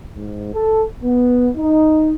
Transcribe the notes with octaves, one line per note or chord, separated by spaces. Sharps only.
G#2
A4
B3
D#4